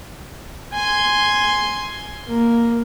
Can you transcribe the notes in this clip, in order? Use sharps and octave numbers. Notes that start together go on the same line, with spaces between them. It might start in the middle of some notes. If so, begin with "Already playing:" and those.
G#5 C6
A#3